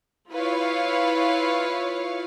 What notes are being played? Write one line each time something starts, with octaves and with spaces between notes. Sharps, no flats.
E4 F4 B4 C#5 F5